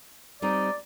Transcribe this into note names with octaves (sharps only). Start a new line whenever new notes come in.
G3 C4 D#4 D5